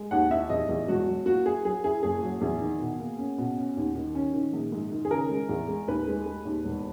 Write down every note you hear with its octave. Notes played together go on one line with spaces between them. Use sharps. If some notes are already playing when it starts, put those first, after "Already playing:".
Already playing: G#3
D#2 F#5
D#4 E5
E2 D#5
E2
E1 F#4
F#3
A#3 F#4
E4 G#4
F#3 G#4
E4 G#4
F#1 G#4
F#3
E2
D#3
B2
A#3
C#4
B2
C#4
D#2
D#3
C#4
D#3
A#1
G#2
D#3
G#4
C#3 A#4
G#3
E2
G#3
D#2 B4
G#3
G#3
D#2
E1